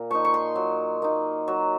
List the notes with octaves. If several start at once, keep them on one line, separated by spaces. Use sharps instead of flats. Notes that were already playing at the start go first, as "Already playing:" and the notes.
Already playing: A#2
F3 A#3 D#4 C#6
C#6
C6
F#3
A#3 D#4
F#3